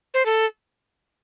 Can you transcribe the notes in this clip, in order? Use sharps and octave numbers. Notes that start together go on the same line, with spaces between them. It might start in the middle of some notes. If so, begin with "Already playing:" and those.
C5
A4